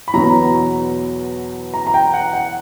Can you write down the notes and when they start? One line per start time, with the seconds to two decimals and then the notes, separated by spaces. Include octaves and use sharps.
0.08 B5
0.14 E2 B2 F#3 A#5
1.74 A#5
1.87 A#5
1.94 G5
2.14 F#5
2.34 F#5